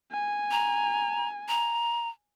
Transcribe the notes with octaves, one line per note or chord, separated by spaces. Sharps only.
G#5
A#5
A#5